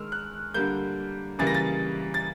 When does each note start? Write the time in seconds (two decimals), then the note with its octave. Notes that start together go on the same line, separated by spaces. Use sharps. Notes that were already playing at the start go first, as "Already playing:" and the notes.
Already playing: D#3 G#3 E6 F6
0.12 F#6
0.54 D3 G3 A#3 G6
1.39 C#3 E3 G3 A#3 A6
1.47 A#6
1.54 A6
2.14 A6